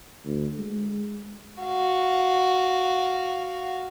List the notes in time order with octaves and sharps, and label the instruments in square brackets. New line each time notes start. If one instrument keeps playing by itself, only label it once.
[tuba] D2
G#3
[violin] F#4 F5